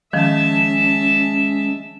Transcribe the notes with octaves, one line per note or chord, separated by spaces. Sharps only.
D#3 F3 G#3 C#4 E5 A5